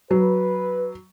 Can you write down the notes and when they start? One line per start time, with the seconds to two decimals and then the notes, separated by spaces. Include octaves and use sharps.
0.11 F#3 B4